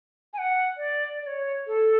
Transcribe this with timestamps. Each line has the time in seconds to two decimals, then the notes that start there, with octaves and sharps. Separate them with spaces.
0.33 G#5
0.38 F#5
0.77 D5
1.22 D5
1.27 C#5
1.67 A4